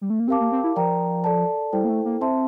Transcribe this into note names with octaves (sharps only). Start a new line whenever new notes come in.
G3
A3
A#3
C4 G4 A#4 F5 A5 D6
A#3
C4
E4
F3 A#4 D5 G5 A#5
A4 D5 A5
G3 E4 A4 C5 G5
A#3
A3
A#3
C4 C5 E5 A5 C6